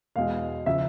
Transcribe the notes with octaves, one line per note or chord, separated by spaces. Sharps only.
E2 B2 G#3 F5
C#3 F3 E5